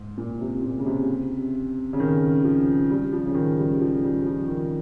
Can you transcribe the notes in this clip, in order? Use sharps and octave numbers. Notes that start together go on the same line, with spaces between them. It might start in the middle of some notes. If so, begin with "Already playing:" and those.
Already playing: G#2
A#2
C3
A#2
C#3
C3
C#3
D#3
F3
G3
F3
C#3
D#3
G3
F3
G3
F3
D#3